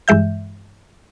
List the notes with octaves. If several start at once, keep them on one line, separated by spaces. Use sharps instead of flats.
G2 E3 G#3 E5 G6